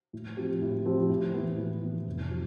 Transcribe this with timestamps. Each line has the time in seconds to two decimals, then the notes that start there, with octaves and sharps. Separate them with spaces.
0.13 A2
0.37 F3 C4 G4
0.62 A2
0.86 F3 C4 G4
1.09 A2
1.34 E3 B3
1.58 A2
1.82 E3 B3
2.06 F1
2.31 C3 F3